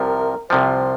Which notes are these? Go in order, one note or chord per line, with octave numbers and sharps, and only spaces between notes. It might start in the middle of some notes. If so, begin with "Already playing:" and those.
Already playing: C2 C3 F3 A#4
C2 C3 F3 C5